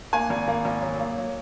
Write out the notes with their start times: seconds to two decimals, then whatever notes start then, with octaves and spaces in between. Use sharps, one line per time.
0.13 A#3 G#5
0.30 G#1
0.47 A#3
0.65 G#1
0.82 F#3
0.99 A#3
1.18 F#3